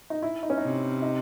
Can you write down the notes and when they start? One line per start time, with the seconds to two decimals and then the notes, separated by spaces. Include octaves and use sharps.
0.10 D#4
0.22 E4
0.43 D#4
0.50 C#4
0.58 C3 D#4
1.02 D#4